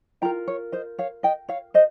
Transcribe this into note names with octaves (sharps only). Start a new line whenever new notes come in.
F4 A#4 G5 A#5
C#5
C5 D#5
C#5 F5
D#5 G5
C#5 F5
C5 D#5